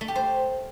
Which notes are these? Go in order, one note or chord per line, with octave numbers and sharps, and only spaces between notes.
A3
G4
C5